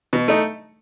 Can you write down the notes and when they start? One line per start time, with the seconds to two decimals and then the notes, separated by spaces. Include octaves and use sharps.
0.13 B2
0.28 A3 D#4